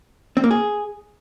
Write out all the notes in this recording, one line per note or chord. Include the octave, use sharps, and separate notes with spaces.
C4
A#3
G#4